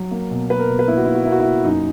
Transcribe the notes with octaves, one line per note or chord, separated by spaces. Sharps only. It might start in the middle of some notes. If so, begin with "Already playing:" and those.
Already playing: F#3
A#3
B2
A#3 B4
A#4
B2
B4
A#3 E4
F#4
A#3 E4
F#4
A#3 E4
F#4
E4
A#3
F#2 D#4